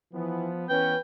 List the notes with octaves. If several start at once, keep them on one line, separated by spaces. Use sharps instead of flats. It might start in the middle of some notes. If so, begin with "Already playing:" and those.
E3 F3 B3
E3 B3 C#4 B4 G5